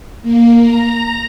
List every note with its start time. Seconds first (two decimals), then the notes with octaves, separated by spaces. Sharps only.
0.23 A#3
0.61 A#5